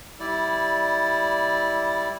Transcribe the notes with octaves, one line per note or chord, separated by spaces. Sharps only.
G3 E4 D5